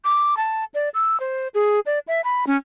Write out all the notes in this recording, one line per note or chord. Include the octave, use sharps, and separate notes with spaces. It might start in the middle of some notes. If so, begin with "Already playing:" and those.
D6
A5
D5
E6
C5
G#4
D5
E5
B5
C#4